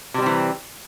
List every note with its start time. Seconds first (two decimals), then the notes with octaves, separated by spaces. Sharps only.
0.14 C3
0.18 G3
0.22 C4
0.26 E3